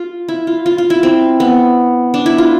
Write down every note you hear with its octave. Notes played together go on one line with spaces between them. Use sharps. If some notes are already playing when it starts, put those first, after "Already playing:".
Already playing: F4
E4
F4
F4
F4
E4
C4
B3
D4
E4
F4